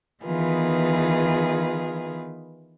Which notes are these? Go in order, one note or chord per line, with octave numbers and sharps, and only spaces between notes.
D#3 E3 B3 F4 G#4 B4